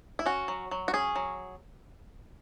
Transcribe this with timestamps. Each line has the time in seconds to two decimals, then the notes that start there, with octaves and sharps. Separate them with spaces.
0.19 E4
0.26 C#4 F#4
0.48 F#3
0.71 F#3
0.88 F#4
0.93 C#4 G#4
1.16 F#3